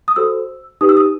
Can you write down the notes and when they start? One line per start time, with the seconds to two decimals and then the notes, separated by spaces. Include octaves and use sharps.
0.08 D#6
0.16 F#4 A4 C5 E6
0.81 D#4 G4 B4 D#6
0.89 E6
0.97 D#6